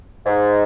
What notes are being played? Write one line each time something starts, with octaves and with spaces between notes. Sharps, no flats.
G#2